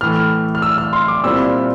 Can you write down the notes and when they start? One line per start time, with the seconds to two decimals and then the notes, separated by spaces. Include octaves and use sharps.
0.01 A2 E3 A3 F6
0.55 F6
0.62 E6
0.78 F6
0.93 C6
1.08 D6
1.24 A#2 G3 C4 E4 E6